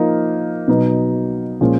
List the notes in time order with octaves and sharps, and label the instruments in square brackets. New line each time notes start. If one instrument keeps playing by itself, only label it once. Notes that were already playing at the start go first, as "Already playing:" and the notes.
Already playing: [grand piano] F3 A#3 D#4
B2 F#3 B3 D#4
A#2 F3 G#3 C#4